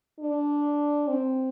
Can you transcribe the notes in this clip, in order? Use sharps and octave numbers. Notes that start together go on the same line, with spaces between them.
D4
C4